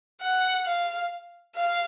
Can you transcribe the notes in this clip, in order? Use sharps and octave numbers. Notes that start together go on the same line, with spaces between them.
F#5
F5
F5